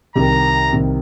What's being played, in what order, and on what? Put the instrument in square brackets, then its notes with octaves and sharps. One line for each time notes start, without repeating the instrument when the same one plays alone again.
[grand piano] C2 C3 D#3 [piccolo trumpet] A#5
[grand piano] C2 C3 D#3